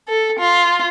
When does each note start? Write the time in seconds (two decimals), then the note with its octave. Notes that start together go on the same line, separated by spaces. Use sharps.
0.08 A4
0.40 F4